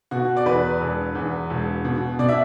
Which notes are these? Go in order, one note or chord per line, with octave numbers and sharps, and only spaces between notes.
B2 F#4
D5
E2 B4
E1
E2
E1
B2
B2 D5
E5